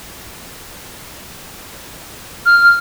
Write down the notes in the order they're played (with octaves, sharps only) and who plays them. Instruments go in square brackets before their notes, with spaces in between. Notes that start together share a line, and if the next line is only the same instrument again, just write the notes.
[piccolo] F6